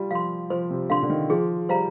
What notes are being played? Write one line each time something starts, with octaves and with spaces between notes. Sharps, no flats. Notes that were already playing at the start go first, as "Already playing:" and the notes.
Already playing: G3 F4
F3 F5 C6
F3 C5
C3
D3 F5 C6
D3
D#3
F3 G#4
G3 C5 F5 A#5